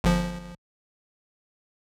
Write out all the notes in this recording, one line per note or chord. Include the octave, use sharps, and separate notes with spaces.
G1 F3